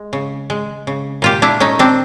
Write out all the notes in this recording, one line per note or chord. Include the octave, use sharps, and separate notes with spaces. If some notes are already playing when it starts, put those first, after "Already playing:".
Already playing: G#3
C#3
G#3
C#3
A#2 F4 G4
D4 E4
A3 C#4 D#4
C4 D4